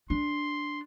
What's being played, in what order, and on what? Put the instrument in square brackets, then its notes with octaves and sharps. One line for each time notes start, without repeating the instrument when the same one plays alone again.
[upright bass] D4 [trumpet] C6